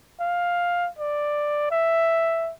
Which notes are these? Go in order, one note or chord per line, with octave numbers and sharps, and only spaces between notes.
F5
D5
E5